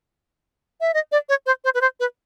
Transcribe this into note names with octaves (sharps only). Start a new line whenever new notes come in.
E5
D#5
D5
C#5
C5
C5
B4
C5
B4